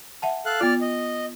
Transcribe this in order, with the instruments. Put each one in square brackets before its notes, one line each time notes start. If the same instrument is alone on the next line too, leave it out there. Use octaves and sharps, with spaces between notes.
[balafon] E5 F#5 A5
[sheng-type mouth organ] A4 F5 F#6
[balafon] B3 F4 [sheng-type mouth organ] D5 F6
[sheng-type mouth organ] D#5